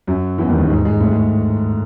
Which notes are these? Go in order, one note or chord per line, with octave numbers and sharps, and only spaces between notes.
F#2 F#3
E2 E3
D#2 D#3
D#2 D#3
G#2 G#3
G#2 G#3
A2 A3
G#3